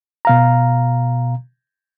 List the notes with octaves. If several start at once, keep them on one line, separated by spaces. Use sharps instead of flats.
B2 F5 A#5